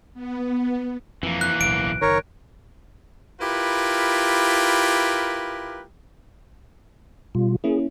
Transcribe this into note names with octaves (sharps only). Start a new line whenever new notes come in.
B3
F2 E3 A#3
F#6
D1 B1 D7
F#1 C2 D#3 A#4 C#5
E4 F4 G4 A#4 B4
B2 G3 F4
A#3 C#4 E4 G#4